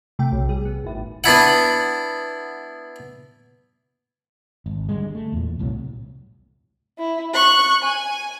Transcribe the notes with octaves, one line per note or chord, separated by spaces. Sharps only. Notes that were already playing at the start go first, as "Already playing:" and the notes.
C3 A3 G5
B1
G3 G#4
B3
G#1 A2
B3 D4 E4 F#5
G#1
D3 G3 G#3
A3
E2 A#2
C2 A2 C3 F#3
E4
C#6 F#6
G#5